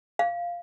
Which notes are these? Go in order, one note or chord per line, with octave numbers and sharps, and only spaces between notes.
F5